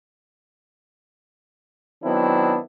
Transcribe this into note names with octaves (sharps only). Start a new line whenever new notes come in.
D#3 F#3 B3 C4 D4 E4